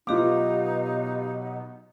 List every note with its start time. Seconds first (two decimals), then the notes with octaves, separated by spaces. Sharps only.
0.07 B2 F#3 B3 D#4 F4 G4 F5 D6